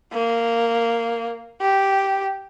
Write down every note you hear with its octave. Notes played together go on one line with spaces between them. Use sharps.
A#3
G4